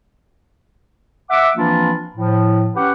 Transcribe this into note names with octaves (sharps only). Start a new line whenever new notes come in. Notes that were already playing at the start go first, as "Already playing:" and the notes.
E5 F#5 D6
E3 F3 A#3 C4 D4 F4
A2 F3
C#4 G4 B4 F#5